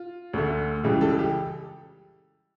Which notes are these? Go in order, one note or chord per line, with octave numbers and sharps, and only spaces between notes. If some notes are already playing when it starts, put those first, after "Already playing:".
Already playing: F4
D2 D3 A3
C#2 C#3 E3 G3 G4
A4
G4